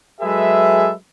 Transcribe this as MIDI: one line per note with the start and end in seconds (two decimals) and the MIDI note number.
0.21 0.92 54
0.21 0.92 56
0.21 0.92 68
0.21 0.92 69
0.21 0.92 71
0.21 0.92 76